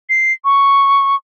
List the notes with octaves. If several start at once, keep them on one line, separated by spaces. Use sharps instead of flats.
C7
C#6